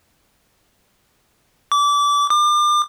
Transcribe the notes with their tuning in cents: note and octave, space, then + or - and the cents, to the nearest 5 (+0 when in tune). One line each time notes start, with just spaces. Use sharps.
D6 -25
D6 +35